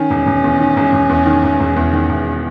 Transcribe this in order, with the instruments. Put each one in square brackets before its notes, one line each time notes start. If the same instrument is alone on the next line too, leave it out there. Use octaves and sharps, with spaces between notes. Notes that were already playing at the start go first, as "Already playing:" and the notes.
Already playing: [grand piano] D#3 [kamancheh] C#4
[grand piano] E1
E1
E2
D#3
E1
E1
E2
D#3
E1
E1
E2
D#3
E1